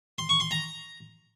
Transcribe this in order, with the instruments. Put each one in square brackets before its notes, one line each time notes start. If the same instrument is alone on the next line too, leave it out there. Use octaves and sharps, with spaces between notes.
[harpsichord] C6
C#6
C6
A#5